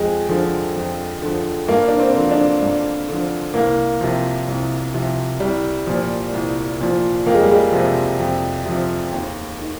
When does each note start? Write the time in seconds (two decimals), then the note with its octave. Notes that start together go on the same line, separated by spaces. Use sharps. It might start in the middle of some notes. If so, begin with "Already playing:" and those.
Already playing: F2 G#3
0.29 D3 F3
0.76 F2
1.22 D3 F3
1.68 G2 A#3
1.88 D4
2.00 C4
2.15 D3 F3
2.31 D4
2.62 G2
3.09 D3 F3
3.54 C2 A#3
4.01 C3 F3
4.48 C2
4.94 C3 F3
5.40 C2 G3
5.87 A#2 F3
6.33 C2
6.80 A#2 F3
7.26 F2 A#3
7.34 G#3
7.43 G3
7.51 G#3
7.72 C3 F3
8.19 F2
8.65 C3 F3
9.13 D#2
9.58 D#3